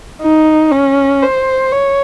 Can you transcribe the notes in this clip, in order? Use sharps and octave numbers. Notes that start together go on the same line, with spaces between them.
D#4
C#4
C5
C#5